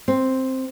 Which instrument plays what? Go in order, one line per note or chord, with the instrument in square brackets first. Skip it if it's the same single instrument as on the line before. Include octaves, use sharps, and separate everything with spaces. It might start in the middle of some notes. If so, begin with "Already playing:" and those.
[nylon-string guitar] C4